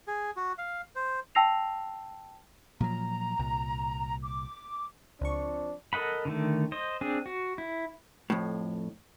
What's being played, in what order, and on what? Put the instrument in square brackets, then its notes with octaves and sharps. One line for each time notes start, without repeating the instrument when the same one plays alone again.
[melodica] G#4
F#4
F5
C5
[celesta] G5 A5 E6 A#6 C7 F7
[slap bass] A#2 F3 F#3 [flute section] A#5
[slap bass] C2 A#2
[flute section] D6
[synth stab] C#2 C#6 [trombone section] F3 C4 D4
[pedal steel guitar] A4 A#4 D#5 F#5 B5
D3 D#3 A3
C5 D#5
C4 D4 G#4
F#4
E4
[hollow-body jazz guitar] F2 A2